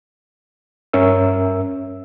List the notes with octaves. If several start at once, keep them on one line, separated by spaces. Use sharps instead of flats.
G2 C#4 A#4 E5 E6